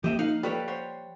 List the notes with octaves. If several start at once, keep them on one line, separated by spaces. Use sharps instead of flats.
F3 A#3 G4 D#5 E5 G5
D#4 F5 F#5
G3 A4 B4 C#5
C5 C#5 F#5